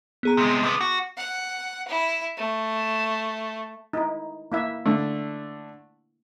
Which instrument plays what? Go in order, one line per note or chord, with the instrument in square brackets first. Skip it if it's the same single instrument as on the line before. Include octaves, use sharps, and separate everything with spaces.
[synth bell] B3 G#4 A#5
[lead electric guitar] C3 G#3
[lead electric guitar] C3 B3 [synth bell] D6
[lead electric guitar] F#4
[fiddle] F#5
E4
A3
[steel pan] D#4 E4
A#3 E4 E5
[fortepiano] D3 A3